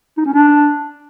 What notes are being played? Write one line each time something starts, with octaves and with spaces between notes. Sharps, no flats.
D#4
C#4
D4